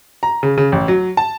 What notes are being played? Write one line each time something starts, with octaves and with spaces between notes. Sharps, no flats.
A#5
C#3
C#3
A1
F#3
A5